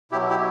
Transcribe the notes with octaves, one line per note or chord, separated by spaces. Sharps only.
B2 F#3 E4 G4
E4 G4